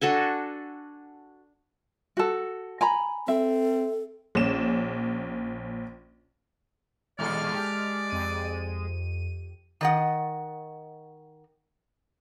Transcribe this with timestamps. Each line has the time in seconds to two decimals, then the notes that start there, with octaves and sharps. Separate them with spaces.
0.01 D4 F#4 A4 G#5
2.17 F#4 A4
2.81 G#5 A#5 B5
3.28 C4 A4 E5
4.35 A#1 C#4 E7
7.19 D#2 A#2 G#3 A4 D5 F6
7.55 G4
8.10 F2 D#7
9.81 D#3 D#5 F#5